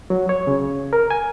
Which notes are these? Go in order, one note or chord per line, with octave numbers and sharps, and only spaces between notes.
F#3
C#5
C#3
A#4
G#5